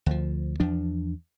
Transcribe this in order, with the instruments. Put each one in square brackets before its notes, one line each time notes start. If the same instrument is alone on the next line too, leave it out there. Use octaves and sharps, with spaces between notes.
[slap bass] D2 F3
E2 F3 D4